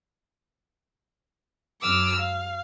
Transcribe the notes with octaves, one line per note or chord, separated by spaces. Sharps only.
F#2 D6 E6 F6
F5